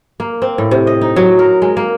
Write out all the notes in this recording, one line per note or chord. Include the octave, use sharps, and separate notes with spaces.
A#3
C4
A2
C3
D#5
D#4
F#3
A#4
G#3
A#3